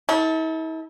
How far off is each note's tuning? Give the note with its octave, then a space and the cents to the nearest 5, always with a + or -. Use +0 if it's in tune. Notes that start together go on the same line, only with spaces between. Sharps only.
E4 -45 A4 +0